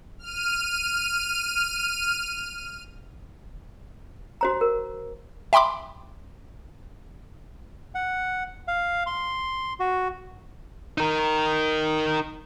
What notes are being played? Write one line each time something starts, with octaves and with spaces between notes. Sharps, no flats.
F6 D#7
F#4 C5 A#5
A#4
E5 G5 B5 C6 D6
F#5
F5
C6
F#4
D#4 A#4